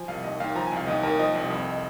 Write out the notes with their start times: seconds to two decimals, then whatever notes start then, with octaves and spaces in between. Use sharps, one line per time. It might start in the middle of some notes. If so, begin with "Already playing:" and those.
Already playing: F3 G#5
0.08 C2 F5
0.24 D#2 D#5
0.40 D#2 F5
0.55 F3 A#5
0.66 G#5
0.72 C2 F5
0.87 D#2 D#5
1.03 D#2 A#4
1.19 F3 D#5
1.35 C2
1.50 F2